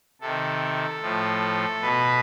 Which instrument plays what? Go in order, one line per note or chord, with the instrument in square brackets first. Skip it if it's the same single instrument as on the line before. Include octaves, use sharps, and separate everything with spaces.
[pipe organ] C3 D#3 A4
A2 F3
B2 B4